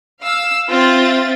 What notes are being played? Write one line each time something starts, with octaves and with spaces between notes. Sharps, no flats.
F5 E6
C4 F4 E5 A6